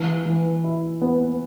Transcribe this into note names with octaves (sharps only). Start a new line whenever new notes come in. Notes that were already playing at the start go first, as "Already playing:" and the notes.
Already playing: E3
E3
E4
B3